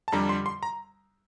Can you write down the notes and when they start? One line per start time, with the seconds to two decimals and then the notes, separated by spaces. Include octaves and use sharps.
0.08 A5
0.12 F2 D3 G3 A#5
0.29 C6
0.46 C6
0.63 A#5